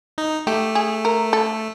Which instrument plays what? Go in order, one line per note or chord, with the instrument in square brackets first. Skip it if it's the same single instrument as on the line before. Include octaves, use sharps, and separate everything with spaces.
[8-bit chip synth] D#4
[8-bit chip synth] A3 [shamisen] G4
[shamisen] G#4
A#4
A4